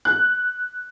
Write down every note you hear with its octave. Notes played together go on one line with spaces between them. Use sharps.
F#6